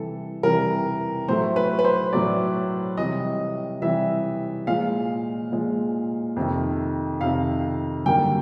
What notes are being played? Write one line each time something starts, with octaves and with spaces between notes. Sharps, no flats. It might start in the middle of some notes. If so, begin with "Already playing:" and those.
Already playing: C3 E3 G3 A4
C3 E3 G3 A#4
A2 F#3 A3 C5
B4
B4
C5
A2 F#3 A3 D5
C3 E3 G3 D#5
C3 E3 G3 E5
A#2 F3 G#3 F5
A#2 F3 G#3
F2 C3 D#3
F2 C3 D#3 F5
G2 D3 F#3 A#3 G5